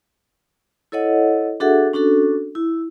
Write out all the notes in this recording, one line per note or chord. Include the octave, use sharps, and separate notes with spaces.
E4 A4 C#5 D#5 F#5
D4 F#4 G#4 A4 E5 F#5
C#4 D4 F#4 A4
E4